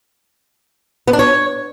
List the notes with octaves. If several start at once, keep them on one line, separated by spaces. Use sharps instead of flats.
B3
D4
C#5